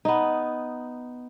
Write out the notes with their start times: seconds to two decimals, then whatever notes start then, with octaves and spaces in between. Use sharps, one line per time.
0.05 B3 D#4